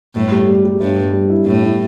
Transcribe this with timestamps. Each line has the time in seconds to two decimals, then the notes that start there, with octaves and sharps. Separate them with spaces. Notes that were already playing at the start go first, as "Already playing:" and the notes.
0.15 G1 A2
0.32 G3
0.48 G3
0.65 G3
0.80 G1 G2
0.98 G1
1.13 G3
1.30 E4
1.46 G1 A2
1.63 E4